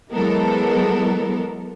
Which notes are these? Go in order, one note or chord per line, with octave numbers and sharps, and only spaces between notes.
E3 F#3 G#3 B3 A4 A#4